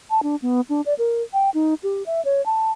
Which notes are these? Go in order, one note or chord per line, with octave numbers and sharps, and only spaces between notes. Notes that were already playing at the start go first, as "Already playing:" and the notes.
A5
D4
B3
D4
D5
A#4
G5
D#4
G4
E5
C#5
A5